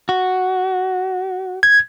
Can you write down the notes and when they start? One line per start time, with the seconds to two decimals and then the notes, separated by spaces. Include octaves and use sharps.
0.09 F#4
1.63 G#6